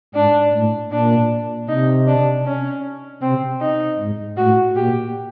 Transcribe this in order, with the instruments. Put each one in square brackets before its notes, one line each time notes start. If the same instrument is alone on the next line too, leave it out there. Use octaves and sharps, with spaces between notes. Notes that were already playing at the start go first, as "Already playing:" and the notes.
[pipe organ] G#2 [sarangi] D4
[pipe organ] A2
[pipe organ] A#2 [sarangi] D4
[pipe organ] C3 [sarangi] D#4
[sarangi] D4
C#4
[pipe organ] C3 [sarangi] C4
[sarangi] D#4
[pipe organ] G#2
[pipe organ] A2 [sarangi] F#4
[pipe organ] A#2 [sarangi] G4